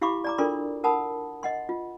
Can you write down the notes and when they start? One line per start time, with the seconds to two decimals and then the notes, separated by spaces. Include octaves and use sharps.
0.02 E4 G4 F5 B5 C#6 D6
0.24 D5 A#5 D6
0.38 D4 F4 A4 A#4 D5 C6
0.84 A#4 F#5 A5 B5 D#6
1.43 D#5 F#5 C6
1.69 F4